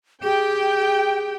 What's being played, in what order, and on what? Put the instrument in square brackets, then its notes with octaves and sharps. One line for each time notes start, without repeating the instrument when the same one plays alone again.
[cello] G4 [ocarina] G#4 [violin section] G5